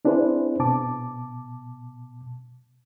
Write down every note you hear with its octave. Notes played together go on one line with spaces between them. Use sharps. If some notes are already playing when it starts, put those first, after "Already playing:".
C4 D4 E4 G#4 B4 C5
B2 A5 D6